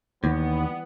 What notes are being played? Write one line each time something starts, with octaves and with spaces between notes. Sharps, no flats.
D#2 E3 G3 B3